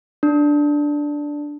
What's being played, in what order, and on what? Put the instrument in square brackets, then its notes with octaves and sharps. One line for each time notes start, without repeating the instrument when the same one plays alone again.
[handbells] D4